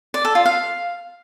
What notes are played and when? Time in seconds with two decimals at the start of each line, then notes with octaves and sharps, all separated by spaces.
0.14 D5
0.25 A4
0.35 F4
0.46 F5